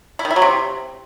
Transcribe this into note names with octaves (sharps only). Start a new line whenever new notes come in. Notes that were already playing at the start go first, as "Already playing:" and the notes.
E4
D#3
E4
F#3
C3